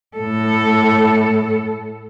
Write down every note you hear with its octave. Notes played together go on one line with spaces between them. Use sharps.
A2 A4